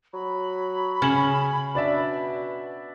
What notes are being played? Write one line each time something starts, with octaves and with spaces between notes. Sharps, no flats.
F#3 B5
C#3 C#4 E7 F#7
B2 D4 D5 E5